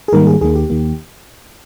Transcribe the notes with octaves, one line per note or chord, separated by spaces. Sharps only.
G#4
G#2 D#3 G3 A#3 A#4
G#4
D#2 D#3 A#3 G#4
G4
D#2 D#3 A#3